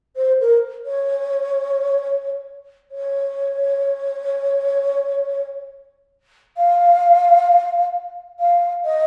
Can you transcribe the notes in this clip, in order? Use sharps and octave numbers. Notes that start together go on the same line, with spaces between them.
C5
A#4
C#5
C#5
F5
F5
D#5